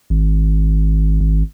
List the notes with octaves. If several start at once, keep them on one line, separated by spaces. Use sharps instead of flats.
G#1
G#1